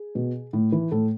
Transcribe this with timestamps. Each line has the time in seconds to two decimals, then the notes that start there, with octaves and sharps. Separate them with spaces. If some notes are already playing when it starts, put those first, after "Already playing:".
Already playing: G#4
0.15 B2
0.53 A2
0.72 E3
0.91 A2 A4